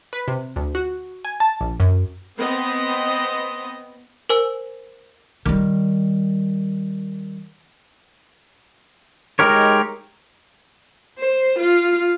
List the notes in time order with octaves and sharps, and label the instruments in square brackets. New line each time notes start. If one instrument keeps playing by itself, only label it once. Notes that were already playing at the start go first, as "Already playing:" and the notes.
[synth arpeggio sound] B4
C3
D2
F#4
G#5
A5
A#1
F#2
[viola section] B3 C4 D#5
[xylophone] A#4 C5 G#5 E6
[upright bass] D#3 G3
[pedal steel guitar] G#3 D#4 G4 A#4 C#5
[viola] C5
F4